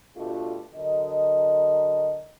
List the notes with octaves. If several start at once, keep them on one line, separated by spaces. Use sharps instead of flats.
B2 A3 D4 F4 G4
D3 F#3 A#4 D#5